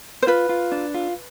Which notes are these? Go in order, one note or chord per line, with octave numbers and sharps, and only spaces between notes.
C5
F4 B4
F4
D4
F4